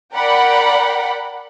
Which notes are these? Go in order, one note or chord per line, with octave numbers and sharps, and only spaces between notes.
A#4 D5 F#5 G5 B5